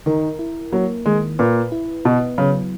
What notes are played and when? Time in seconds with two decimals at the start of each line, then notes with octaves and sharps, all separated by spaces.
0.06 D#3 A#4
0.39 E4
0.72 F#3 A#3
1.06 D#3 G#3
1.39 A#2 B4
1.72 E4
2.05 B2 B3
2.38 C#3 F#3